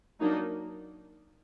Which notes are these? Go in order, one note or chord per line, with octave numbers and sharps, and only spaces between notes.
F#3 A#3 D4 D#4